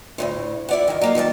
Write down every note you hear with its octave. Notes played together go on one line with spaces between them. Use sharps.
D2 A2 C3
E4 D5 F#5
G2 D#3
F#3 A#3 D#4
D#3 G3 D5 A5